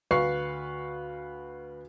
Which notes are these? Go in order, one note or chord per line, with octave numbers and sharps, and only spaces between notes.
D2 B4 F5 C#6 C7